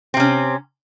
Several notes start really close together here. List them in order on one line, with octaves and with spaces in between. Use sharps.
C4 C3 C#4